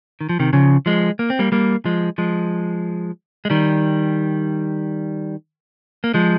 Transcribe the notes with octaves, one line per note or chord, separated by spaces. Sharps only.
D#3
F3
C3 D#3
C#3 F3
F3 G#3
A#3
C4
G3 A#3
G3 A#3
F3 G#3
F3 G#3
G#3
D#3 G3
A#3
F3 G#3